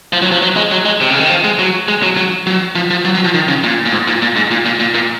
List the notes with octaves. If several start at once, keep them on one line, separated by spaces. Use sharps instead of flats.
F3
F#3
F3
F#3
G#3
F#3
G#3
C3
C#3
D#3
F3
G#3
F#3
G#3
F#3
F#3
F#3
F3
F3
F#3
F#3
F3
D#3
C#3
A#2
A#2
G#2
A#2
A#2
G#2
A#2
A#2
A#2
A#2